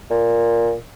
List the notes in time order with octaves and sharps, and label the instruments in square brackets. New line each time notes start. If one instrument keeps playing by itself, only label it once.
[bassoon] A#2